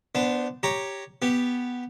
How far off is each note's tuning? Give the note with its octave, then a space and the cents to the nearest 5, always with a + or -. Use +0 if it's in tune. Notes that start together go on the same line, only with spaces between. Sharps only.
B3 +0 D4 +0 C5 -20
G4 +0 C#5 +0 A#5 +0
B3 +0 G4 +0